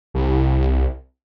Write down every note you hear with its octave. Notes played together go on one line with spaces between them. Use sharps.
C2